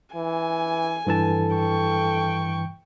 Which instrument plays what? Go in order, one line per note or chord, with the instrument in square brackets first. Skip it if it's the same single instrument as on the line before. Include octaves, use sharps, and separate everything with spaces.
[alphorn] E3 [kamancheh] G#5
[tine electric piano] G2 E3 A5 [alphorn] A4
[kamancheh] G5 C#6